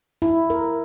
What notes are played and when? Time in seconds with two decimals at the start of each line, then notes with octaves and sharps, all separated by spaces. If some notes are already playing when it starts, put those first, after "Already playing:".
0.22 E4
0.50 A#4